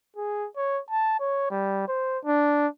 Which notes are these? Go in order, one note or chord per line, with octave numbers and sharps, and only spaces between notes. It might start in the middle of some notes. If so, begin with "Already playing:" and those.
G#4
C#5
A5
C#5
G3
C5
D4